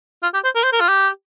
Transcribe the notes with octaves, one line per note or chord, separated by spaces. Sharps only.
F4
G4
C5
A#4
C5
A#4
F4
G4